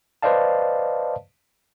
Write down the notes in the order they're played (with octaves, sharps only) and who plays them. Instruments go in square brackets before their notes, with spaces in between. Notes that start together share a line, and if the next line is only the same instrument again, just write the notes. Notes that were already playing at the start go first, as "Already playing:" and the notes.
[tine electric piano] B4 C5 D5 D#5 F5 A5